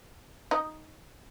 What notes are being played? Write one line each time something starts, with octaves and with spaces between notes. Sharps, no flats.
D#4 D#5